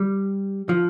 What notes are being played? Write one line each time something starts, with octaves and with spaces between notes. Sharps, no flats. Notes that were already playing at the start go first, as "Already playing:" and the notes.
Already playing: G3
F3